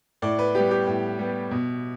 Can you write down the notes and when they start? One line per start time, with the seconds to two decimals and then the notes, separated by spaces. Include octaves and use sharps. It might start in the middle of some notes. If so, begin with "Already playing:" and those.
0.22 A2 D5
0.39 B4
0.55 G3 B3 G4
0.71 G4
0.87 A2
1.19 G3 B3
1.51 B2